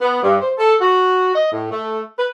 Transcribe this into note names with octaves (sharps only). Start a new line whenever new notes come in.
B3
G2
C5
A4
F#4
D#5
A2
A3
B4